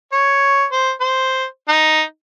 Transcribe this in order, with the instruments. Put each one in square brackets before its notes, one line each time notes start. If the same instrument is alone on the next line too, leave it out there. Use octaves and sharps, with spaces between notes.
[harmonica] C#5
C5
C5
D#4